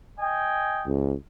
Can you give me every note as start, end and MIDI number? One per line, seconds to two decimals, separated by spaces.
0.19 0.86 75
0.19 0.86 79
0.19 0.86 80
0.86 1.14 37